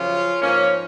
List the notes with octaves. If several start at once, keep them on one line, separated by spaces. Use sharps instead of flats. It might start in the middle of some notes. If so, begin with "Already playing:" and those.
Already playing: F#2 C#3 F3 C#4 F4
G#2 F3 A#3 C#4